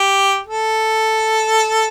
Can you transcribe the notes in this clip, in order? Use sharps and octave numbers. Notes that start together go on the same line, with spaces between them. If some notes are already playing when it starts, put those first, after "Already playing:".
Already playing: G4
A4